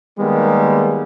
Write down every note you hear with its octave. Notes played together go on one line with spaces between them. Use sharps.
D#3 G3 G#3 A#3 B3